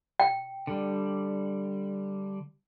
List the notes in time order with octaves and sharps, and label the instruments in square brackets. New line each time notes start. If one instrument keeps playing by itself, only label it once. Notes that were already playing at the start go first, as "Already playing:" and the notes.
[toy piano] G5
[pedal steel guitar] D3 G3